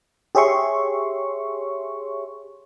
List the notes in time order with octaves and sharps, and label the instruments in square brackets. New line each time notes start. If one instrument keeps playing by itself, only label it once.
[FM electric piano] G4 G#4 C#5 E5 C6 C#6